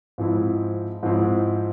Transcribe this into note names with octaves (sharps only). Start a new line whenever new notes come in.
G#2 F3 G#3 C4 E4
G#2 F3 G#3 C4 E4